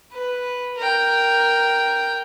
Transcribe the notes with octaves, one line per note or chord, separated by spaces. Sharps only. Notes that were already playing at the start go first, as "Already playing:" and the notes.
B4
A#4 G5